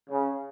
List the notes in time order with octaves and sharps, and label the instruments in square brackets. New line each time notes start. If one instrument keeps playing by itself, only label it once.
[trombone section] C#3